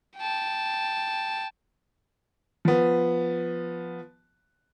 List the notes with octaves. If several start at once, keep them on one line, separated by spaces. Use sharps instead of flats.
G5 A5
F3 B3